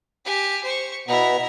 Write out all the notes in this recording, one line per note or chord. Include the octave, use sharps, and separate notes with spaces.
G4 G#5
C5 C#6
B2 B3 E4 A#5